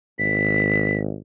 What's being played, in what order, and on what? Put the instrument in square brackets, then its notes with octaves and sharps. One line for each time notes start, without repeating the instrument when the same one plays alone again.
[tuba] G#1 [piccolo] B6